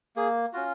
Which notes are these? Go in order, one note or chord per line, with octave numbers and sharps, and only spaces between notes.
A#3 G#4
C#4 F4 F#4